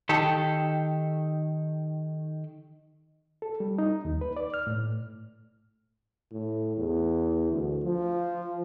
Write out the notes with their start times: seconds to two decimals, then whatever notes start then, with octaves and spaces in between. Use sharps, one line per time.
0.09 D#3 G4 A4
3.42 A4
3.60 G3
3.78 D#4
4.05 D#2
4.21 B4
4.37 D5
4.54 F6
4.67 A2
6.32 A2
6.77 E2
7.51 D2
7.83 F3